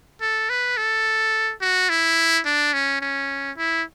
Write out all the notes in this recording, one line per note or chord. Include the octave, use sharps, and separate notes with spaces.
A4
B4
A4
F#4
E4
D4
C#4
C#4
E4